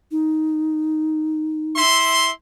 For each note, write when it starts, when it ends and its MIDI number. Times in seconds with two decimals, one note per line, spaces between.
0.11 1.81 63
1.75 2.29 64
1.75 2.29 76
1.75 2.29 84